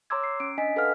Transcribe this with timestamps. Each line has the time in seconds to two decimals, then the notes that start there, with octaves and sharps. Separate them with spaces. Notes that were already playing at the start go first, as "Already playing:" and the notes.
0.10 C#5 A#5 C6 D6 E6 G#6
0.24 C7
0.40 C#4 D7
0.58 D4 D#5 G#5 B6
0.76 A4 B4 F5 F#5 F6